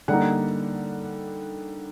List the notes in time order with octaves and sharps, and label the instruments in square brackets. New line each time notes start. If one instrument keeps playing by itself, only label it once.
[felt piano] D3 G3 A#3 D#4 F#5